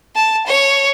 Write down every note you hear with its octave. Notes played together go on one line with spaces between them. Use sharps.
A5
C#5